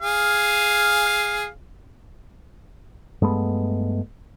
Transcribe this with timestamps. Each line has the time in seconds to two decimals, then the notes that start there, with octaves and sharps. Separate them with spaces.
0.02 G#4 F5
3.22 G2 G#3 A3 B3